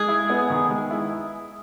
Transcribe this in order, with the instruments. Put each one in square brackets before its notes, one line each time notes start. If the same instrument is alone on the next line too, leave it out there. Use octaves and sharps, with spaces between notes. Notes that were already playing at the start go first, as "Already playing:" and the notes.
Already playing: [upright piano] G#3 [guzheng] G#4
[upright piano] E4
B3
D#3
G#3
E4